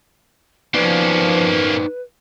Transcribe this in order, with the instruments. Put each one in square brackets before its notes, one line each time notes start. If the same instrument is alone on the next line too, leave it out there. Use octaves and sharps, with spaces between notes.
[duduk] F3 [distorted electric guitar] A#3 C#4 [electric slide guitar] D#4 C5 D5 [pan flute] B4